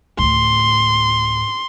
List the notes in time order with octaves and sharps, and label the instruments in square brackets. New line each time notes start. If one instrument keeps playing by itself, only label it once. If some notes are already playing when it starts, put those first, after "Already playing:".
[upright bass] D2 A2 [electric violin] C6